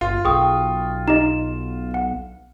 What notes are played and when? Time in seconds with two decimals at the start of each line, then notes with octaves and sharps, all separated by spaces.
0.01 G1 F4
0.25 B1 G#4 A4 G5 C#6 D#6
1.08 D#4 G4 D#5 E7
1.94 F#5